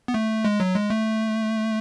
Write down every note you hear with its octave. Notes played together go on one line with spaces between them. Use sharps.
B3
A3
G#3
F#3
G#3
A3